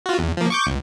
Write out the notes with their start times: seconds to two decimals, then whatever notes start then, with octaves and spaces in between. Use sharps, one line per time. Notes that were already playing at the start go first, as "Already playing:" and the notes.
0.06 F4 F#4
0.19 E2
0.37 F3 A#3
0.50 C#6 D6 G6
0.66 C#2